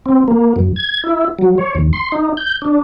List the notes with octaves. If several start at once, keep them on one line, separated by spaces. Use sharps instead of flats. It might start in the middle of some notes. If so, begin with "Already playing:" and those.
C4
A#3
F#2
G#6
E4
F#3
C#5
D#2
C6
D#4
G6
D4